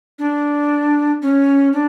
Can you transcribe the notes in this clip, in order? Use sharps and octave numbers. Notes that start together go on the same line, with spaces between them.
D4
C#4
D4